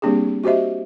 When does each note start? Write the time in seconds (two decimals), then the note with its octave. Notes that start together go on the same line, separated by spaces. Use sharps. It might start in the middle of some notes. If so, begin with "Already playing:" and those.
0.02 G3 A#3 C4 D4 G4 G#4
0.44 F#4 G4 C5 D#5 E5